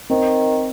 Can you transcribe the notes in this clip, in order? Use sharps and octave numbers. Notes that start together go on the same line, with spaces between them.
D#3 C4